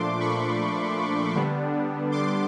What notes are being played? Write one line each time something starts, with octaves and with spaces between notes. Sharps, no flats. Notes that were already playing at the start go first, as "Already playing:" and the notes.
Already playing: A#2 F3 A3 D4 C6 D6
B5 C#6
D3 G3 B3 D4
C6 D6